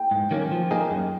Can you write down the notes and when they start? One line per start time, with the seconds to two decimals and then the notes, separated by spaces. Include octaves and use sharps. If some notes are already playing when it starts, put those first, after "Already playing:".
Already playing: G5
0.11 G#2
0.31 D#3 F#3 A#3 C#4
0.51 F3
0.71 A#3 D#4 G#4
0.91 F#2